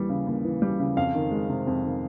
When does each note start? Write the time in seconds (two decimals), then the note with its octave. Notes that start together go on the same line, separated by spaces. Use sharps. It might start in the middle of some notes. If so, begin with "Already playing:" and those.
Already playing: D#2 E3 G3
0.09 C#3
0.27 D#2
0.45 E3
0.62 G3
0.79 C#3
0.97 F2 F5
1.15 D#3
1.31 G#3
1.49 C3
1.67 F2
1.85 D#3